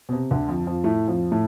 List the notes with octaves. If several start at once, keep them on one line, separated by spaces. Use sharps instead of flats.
B2
C3
D2 D3
F2 F3
F2 F3
A2 A3
F2 F3
A2 A3